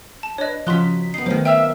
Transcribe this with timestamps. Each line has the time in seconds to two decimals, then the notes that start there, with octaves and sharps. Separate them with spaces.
0.23 A5
0.38 D4 B4 C#5 D#5
0.67 C#3 F3 D#4 F#4 C6 F#6 B6
1.14 B3 D#4 C7
1.26 B2 D#3 F#3 A3 C5
1.45 E5 F5 G5